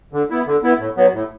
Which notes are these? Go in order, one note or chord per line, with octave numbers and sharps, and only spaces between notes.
D3
B3 E4
D3
B3 E4
A2
F#3 B3
A2